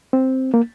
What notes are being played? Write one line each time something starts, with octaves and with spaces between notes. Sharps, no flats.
C4
A#3